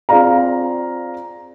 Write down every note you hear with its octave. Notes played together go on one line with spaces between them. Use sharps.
C4 F4 G#4 D5 F5 A#5